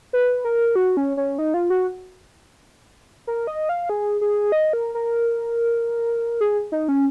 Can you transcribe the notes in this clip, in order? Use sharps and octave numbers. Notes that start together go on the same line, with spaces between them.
B4
A#4
F#4
C#4
C#4
D#4
F4
F#4
A#4
D#5
F5
G#4
G#4
D#5
A#4
A#4
G#4
D#4
C#4